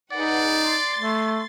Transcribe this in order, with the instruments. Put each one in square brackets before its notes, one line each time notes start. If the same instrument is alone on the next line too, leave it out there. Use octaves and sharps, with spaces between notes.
[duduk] D#4 [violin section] G#4 B4 F#5 [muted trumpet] D5
[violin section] C6 A6
[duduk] A3